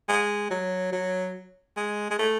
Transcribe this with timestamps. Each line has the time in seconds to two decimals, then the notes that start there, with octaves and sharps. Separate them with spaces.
0.09 G#3
0.50 F#3
0.92 F#3
1.77 G#3
2.10 G#3
2.19 A3